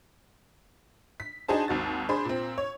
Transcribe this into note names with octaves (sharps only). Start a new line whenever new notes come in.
B6
D4 D#4 F#4 G#4 C5 A5
G#1 D#2 F#4 A6
D4 G#4 C5 B5 C6
A#2 C4
C#5